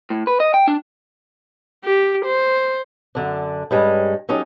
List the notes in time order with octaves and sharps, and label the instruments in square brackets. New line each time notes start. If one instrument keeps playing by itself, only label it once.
[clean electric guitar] A2
B4
D#5
G5
D4
[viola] G4
C5
[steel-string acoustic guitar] F#2 D3 D4
G2 G3 G#3 C#4
F#3 C#4 D#4 G4 A4